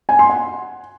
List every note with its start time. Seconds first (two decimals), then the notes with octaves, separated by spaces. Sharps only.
0.09 G#5
0.19 C6
0.29 F#5